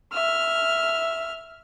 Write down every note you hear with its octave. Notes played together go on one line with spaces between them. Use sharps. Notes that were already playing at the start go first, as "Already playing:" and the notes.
E5 F6